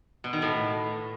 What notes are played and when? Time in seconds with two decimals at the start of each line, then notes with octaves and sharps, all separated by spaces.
0.24 B2
0.33 D#3
0.42 A2